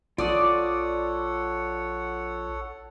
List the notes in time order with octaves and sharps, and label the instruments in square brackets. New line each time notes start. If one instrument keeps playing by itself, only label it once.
[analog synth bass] A#1 [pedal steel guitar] F4 D6 D#6 [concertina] A4 C#5 F#5 [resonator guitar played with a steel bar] D5